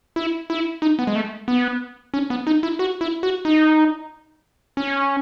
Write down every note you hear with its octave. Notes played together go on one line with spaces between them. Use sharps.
E4
E4
D#4
B3
G#3
A3
B3
C#4
B3
D#4
E4
F#4
E4
F#4
D#4
C#4